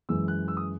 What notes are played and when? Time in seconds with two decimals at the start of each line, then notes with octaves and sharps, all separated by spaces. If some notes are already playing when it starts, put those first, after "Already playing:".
0.09 F#2 E3 G#3 E6
0.28 F#6
0.48 E6
0.57 D#6